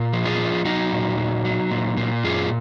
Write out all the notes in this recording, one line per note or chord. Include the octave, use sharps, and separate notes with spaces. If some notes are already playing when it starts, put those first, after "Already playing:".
Already playing: A#2
F3
F4 G#4
F3
F#3 D#4 F#4
A#2
F#3
F#3
A#2
A#2
F#2 F4 G#4